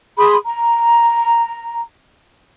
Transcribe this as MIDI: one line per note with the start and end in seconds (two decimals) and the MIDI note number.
0.18 0.35 68
0.18 0.35 83
0.18 0.35 84
0.18 0.35 87
0.46 1.82 82